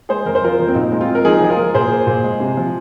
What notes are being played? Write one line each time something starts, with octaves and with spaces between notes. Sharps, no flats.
G#3 G#4 C5
F2 A#4
C5
F3 F4 A#4
F2
C4
A#2 D#4
G#3
C4 F4
G#3
A#4
F3 D#4 G#4
F3 G#4
F4 A#4
F3
A#2 G#4 C5
A#3
A#2
G#3
C3
F3